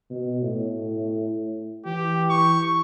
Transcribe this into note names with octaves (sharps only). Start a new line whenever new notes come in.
B2
A2
E3 G4
C#6